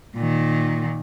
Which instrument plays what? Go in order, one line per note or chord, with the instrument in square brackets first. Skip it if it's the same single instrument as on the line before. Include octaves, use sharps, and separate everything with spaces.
[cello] A#2 D#3